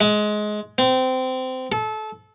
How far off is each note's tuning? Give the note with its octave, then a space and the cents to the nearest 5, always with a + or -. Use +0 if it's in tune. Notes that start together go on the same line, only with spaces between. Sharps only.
G#3 +20
C4 -20
A4 -25